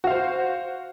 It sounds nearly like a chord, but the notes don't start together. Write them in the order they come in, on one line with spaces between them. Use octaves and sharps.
F#4 F5 C5